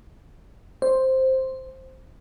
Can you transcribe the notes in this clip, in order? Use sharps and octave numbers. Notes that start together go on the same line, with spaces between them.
C5